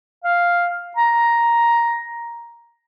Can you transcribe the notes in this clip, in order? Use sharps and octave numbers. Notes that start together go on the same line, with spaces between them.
F5
A#5